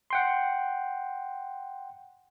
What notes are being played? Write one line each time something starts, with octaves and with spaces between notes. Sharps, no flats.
F#5 G5 C6